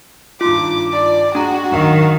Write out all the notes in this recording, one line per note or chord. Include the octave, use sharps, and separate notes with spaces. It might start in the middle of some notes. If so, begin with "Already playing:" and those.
G2 D#3 F4 C6 D6
D5
G#3 D4 F#4 A#5
F#1 D#3 F#3 F5